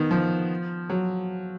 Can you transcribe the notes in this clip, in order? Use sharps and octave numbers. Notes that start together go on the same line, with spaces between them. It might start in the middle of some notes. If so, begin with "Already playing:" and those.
Already playing: D#3 B3
F3
F#3